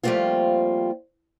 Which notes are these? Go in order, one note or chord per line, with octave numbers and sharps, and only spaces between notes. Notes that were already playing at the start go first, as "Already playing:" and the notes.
F3 G3 A3 A#3 C4 F4